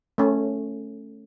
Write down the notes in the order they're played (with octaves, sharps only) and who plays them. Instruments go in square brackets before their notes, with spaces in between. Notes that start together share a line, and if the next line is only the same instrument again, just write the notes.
[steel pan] A3 C#4